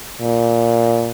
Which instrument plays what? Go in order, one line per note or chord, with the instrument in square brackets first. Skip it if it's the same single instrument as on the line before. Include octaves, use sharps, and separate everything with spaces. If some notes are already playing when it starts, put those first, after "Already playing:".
[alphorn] A#2